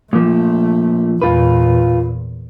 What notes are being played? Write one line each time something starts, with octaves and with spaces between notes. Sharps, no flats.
A#2 F3 A3
E2 A#2 F4 B4